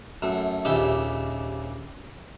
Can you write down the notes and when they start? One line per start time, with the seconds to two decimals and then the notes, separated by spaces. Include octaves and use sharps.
0.22 F#2 A3
0.65 A#1 D#2 C#3 G4 E5